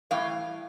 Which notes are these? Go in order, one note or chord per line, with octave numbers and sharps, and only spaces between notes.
A2 E3 G3 F5 G5